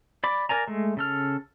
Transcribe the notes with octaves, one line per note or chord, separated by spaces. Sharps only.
D5 B5 D6
A#4 D5 G#5 A#5
G#3 A3
C#3 A4 F6